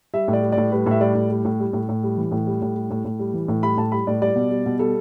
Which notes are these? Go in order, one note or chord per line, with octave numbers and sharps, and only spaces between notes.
G3 E5
A2
D5
G3
D5
A2
G3 B4
A2 E5
G3 D5
A2
G3
A2
G3
A2
A2
G3
E3
A2
G3
A2
G3
A2
A2
G3
E3
A2
G3 B5
A2 A5
G3 B5
A2 D5
G3 D5
B2
G3
B2
G3 A4